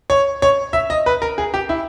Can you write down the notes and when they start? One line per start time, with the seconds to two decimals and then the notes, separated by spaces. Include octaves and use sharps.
0.10 C#5
0.42 C#5
0.73 E5
0.90 D#5
1.06 B4
1.22 A#4
1.38 G#4
1.54 G4
1.69 E4